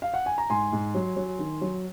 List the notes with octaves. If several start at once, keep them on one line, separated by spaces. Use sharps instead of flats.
F5
F#5
G#5
A#5
G#2 G#5 C6
G#2
F#3
F#3
D#3
F#3